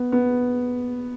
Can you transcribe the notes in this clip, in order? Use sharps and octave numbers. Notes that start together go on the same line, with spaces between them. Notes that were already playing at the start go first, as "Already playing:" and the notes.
Already playing: B3
B3